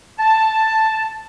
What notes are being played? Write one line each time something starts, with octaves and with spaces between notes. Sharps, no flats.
A5